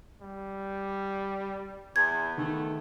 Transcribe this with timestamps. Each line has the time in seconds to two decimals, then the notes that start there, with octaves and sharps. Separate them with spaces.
0.22 G3
1.96 E2 B3 G#6
2.37 E2 D#3 A3